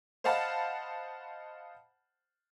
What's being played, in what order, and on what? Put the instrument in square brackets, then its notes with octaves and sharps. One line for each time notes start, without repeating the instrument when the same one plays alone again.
[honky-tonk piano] C5 D#5 F5 F#5 A5 B5